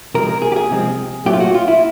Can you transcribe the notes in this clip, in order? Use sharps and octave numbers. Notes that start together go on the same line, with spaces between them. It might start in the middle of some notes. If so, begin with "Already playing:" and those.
C3 F3 G#3 C4 A#4
A#4
G#4
G4
G#4
C3 F3 G#3 C4
A#2 F#3 A3 C4 G4
F4
F#4
F4
E4